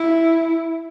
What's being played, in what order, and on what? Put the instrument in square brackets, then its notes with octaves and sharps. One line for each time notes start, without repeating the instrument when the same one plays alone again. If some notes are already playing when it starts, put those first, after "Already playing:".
Already playing: [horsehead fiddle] E4